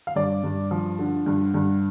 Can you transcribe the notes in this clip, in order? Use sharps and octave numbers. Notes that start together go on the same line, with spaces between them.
F5
G2 D5
G2
F3
D3
G2
G2